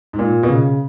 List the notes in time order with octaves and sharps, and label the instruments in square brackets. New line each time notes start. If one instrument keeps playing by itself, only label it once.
[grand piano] G#2
A#2
B2
C#3